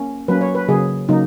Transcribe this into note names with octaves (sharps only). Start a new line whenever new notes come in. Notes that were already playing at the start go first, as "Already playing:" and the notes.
Already playing: A#3 C#4
F#3 A#3 C#4 B4
C#5
B4
C#3 F#3 A#3 G#4
C#3 F#3 A#3 D#4